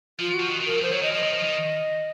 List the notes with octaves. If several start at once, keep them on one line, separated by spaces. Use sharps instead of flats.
F3 F4
F#4
F3
D#3
D#3
F3 A#4
F#3
F3 C5
F#3 C#5
D#3 D#5
F3 D#5
D#3
F3
D#3